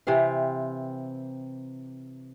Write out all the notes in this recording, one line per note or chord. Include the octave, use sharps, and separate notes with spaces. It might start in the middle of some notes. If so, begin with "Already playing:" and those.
C3 E3 C4 F5